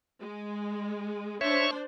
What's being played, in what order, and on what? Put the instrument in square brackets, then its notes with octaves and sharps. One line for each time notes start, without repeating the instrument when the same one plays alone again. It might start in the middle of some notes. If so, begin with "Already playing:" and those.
[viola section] G#3
[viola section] D4 C5 [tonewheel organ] C#5 E5 C#6